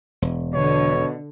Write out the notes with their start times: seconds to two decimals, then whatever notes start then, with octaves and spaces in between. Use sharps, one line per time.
0.22 E1
0.54 B2 D3 C#5